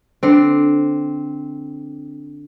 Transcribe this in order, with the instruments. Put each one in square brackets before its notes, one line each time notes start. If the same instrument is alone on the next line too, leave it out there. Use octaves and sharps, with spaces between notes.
[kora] D3 C4